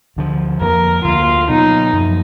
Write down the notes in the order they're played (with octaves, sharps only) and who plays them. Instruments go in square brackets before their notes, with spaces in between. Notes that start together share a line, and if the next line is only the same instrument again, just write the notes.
[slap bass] D2 D3 F3
[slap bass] F2 F3 A#3 [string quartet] A#4
[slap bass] D2 D3 F3 A#3 [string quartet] F4
[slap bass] B2 F#3 B3 [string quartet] D#4
[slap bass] F#2 F3 A#3